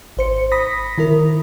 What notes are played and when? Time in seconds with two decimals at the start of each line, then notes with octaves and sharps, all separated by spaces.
0.17 G#1 C5 C#7
0.52 B5 D#6 A#6 B6
0.98 D#3 E4 A#4